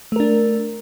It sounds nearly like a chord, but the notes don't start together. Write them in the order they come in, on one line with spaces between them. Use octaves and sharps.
A3 A#4 D4